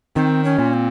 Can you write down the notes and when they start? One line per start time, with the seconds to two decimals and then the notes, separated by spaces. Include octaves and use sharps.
0.16 D#3 C4
0.44 C#4
0.59 A#2
0.73 C4